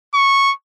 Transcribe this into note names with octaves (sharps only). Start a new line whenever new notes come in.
C#6